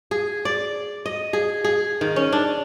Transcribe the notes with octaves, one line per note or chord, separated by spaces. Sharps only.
G#4
D5
D#5
G#4
G#4
D#3
C#4
D4